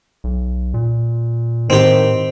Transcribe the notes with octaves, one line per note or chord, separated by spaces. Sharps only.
B1
A#2
A2 D#3 C4 G4